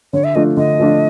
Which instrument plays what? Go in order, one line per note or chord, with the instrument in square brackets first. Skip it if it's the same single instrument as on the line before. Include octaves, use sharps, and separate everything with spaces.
[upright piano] D3 [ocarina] C#5
[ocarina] E5
[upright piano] F3 A3 D4 F4 [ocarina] D#5
[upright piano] D3 [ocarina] D#5
[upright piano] F3 A3 D4 F4